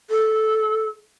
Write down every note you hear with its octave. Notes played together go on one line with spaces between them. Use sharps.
A4